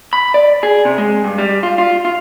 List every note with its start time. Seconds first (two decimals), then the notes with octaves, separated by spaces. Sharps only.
0.13 B5
0.34 D5
0.63 G#4
0.85 C3
0.98 G#3
1.24 G2
1.38 G3
1.63 F4
1.78 F4
2.05 F4